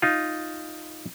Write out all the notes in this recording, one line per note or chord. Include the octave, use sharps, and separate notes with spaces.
D#4 F4